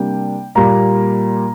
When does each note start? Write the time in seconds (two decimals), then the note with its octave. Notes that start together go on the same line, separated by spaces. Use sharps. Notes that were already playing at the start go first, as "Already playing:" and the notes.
Already playing: C3 G3 A#3 D4 G5
0.55 A#2 G3 A#3 A#5